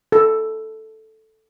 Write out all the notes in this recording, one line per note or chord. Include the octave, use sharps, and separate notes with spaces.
A4